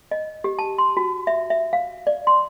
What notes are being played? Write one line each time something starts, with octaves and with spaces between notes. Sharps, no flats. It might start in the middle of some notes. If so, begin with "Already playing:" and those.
D#5
G4
A5
C6
F#4
E5
E5
F5
D5
C6